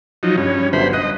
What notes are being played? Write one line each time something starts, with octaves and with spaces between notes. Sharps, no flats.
F3 F#3 D#4
G2 C#4
G1 F#3 C5 B5
D#5 F#6